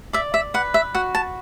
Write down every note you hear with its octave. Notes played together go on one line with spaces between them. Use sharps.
D5 E5
E5
B4 F#5
E5
F#4 F#5
A5